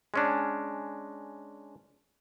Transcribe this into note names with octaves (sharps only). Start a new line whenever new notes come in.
G#3 C#4 D4